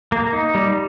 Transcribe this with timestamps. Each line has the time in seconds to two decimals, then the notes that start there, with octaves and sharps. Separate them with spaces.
0.12 A#3
0.33 D#4
0.55 G3